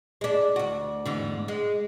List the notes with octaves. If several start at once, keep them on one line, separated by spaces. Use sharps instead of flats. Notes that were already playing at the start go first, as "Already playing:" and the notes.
G#3 D4
D2 F#4
E2 G#2 D3
G#3